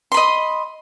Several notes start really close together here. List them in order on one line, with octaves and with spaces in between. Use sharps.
C6 B5 D#5